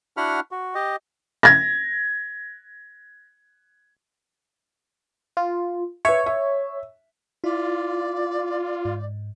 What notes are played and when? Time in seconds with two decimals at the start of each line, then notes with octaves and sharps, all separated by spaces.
0.17 D4 E4 F#4 F#5 B5 F6
0.51 F#4
0.75 G4 D#5
1.43 G#6 A#6
5.37 F4
6.05 B4 C#5 E5
6.26 E5
7.44 E4 F4 D5
8.85 G#2